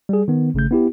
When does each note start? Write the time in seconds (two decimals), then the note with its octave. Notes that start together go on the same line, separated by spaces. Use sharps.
0.09 G3 G#4
0.28 D#3 B3
0.54 G#1 C#3 A3 G6
0.71 B3 E4 G4